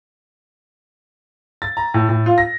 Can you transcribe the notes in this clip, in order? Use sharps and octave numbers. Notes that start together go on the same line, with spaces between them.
A6
A#5
A2
A2
F4
A#6